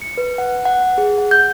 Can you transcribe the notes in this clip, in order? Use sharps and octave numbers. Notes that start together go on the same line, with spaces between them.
C#7
B4
F#5
F#5
G#4
F#5
G6